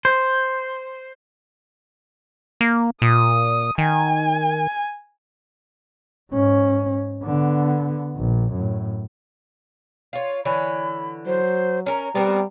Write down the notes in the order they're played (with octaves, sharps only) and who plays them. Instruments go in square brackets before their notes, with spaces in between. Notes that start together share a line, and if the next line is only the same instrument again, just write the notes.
[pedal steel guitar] C5
[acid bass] A#3
[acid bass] A#2 [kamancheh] D#6
[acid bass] D#3 [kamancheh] G#5
[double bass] G#2 C#4
D3 B3
A#1
F#2 A2
[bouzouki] F4 C#5
[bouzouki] D3 E3 C#5 [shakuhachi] B5
[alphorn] F#3 [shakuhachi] C5
[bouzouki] C#4 A#4 [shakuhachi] A#5
[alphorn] G3 [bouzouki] B3 C4 A#4